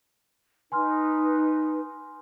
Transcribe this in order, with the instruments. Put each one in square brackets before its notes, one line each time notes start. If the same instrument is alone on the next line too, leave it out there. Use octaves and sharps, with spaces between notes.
[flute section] D#4 B4 [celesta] G#5 C6 F6